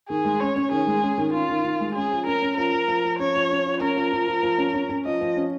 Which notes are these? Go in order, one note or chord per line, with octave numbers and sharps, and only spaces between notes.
D#3 G#4
G#3
C#4 C#5
C#4
D#3 G#4
G#3
C#4
D#3
C#4 F4
D#3
D#3
G#3
C#4 G#4
F3
C#4 A#4
C#4
F3 A#4
F3
F3
F3
C#4 C#5
F3
C#4
F3
C#4 A#4
F3
F3
F3
F3
C#4
C#4
C#4
F3 D#5
F3
C#4